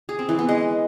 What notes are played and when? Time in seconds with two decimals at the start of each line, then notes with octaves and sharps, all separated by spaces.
0.09 G#4
0.19 C4
0.29 E3
0.39 B3
0.49 G#3